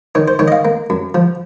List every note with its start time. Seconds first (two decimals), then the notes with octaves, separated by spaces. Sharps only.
0.15 D#3 C#5
0.28 C5
0.39 D#3 C#5
0.48 D#5
0.52 F5
0.65 A#3
0.90 F#2
1.15 F3